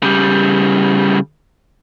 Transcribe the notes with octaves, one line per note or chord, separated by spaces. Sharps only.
C#3 G3